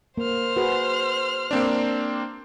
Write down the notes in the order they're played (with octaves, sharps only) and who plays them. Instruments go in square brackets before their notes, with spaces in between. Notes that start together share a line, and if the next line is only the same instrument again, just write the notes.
[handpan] A#3 [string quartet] C5 F6
[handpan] F#4 G#4 B4
[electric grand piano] A#3 C4 D4